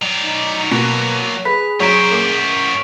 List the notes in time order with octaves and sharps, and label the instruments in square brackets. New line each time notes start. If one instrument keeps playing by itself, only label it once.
[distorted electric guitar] F#3 D5 [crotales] F7
[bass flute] D#4
[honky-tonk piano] B2 [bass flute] A#3
[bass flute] G#4 [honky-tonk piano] B4 [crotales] B6
[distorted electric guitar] F#2 C5 [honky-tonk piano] F#3 A#5 [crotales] C#6 B6 D7
[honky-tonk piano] A#3 D6